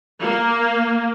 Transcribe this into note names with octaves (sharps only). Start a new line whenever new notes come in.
A#3